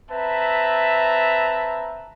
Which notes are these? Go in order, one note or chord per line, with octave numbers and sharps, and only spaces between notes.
C4 B4 E5 A5 A#5